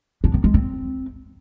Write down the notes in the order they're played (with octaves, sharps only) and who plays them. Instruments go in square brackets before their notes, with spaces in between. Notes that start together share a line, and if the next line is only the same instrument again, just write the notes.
[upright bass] D4
D#3
G#3
C4